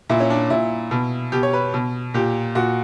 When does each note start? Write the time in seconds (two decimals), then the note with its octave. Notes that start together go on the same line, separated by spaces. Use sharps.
0.10 A#2 E4
0.20 C#4
0.30 D4
0.50 A#2 E4
0.91 B2
1.32 B2 G4
1.43 C#5
1.53 B4
1.74 B2
2.14 A#2 G4
2.55 A#2 F#4